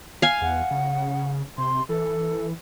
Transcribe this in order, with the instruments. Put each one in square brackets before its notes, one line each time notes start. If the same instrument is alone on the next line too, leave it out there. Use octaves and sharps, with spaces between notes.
[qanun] F5 G#5
[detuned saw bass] E2 [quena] F#5
[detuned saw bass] C#3
[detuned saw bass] C3 [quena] C6
[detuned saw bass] E3 [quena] A4